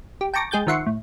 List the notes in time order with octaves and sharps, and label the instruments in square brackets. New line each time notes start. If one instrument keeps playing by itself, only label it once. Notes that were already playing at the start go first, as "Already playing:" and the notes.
[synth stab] G4
G5 A5 A#5 C#6 D6 A#6
G#3 G#4 G5 G6 A6
D#3 F3 E5 F#5 C6 C#6
A2